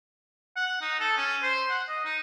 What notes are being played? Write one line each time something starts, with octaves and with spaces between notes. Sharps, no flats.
F#5
D#4
A4
C#4
C5
F#5
D#5
D#4